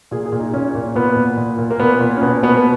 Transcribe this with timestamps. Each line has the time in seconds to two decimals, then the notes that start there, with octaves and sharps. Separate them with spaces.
0.11 A#2 G#4
0.26 G#4
0.32 A#2
0.39 D#4
0.53 A#2 C#4
0.75 A#2
0.95 A#2 B3
1.16 A#2
1.37 A#2
1.59 A#2
1.70 A#3
1.80 A#2 B3
2.01 A#2
2.17 C#4
2.22 B2 B3
2.43 B2 B3
2.57 B3